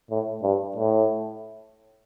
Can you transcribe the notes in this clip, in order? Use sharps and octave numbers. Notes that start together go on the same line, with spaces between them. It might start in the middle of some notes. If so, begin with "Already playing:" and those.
A2
G2
A2